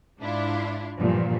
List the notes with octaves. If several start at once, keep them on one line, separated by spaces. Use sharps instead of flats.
G#2 D4 E4 F4
G2 A#2 D3 E3 F3